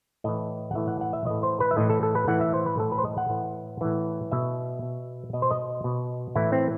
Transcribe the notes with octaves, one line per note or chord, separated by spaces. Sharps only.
A2 E3 D#5
F#5
A2 E3 E5
F#5
F#5
E5
A2 E3 D#5
C5
B4
E5
A2 E3 D#5
A4
A4
B4
A2 E3 F#5
E5
C5
B4
A2 E3 A4
B4
C5
D#5
F#5
A2 E3
A2 E3
B2 E5
B2
B2 D#5
C5
D#5
B2
A2 E3 E4
C4